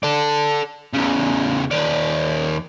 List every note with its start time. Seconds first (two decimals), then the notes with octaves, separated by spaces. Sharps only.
0.03 A4 D5
0.93 E2 C#3
1.71 D#2 D5